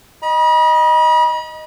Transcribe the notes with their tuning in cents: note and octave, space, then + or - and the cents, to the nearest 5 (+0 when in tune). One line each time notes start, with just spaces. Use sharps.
D#5 +0 B5 -40